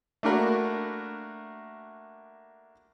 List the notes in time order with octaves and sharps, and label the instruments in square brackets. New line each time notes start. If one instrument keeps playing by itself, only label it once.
[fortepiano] A3 A#3 D4 F#4 A#4 B5